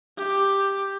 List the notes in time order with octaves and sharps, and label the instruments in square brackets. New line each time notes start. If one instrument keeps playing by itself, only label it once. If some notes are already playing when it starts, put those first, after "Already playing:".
[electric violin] G4